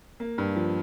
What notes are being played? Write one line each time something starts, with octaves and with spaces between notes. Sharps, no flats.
A#3
G2
F3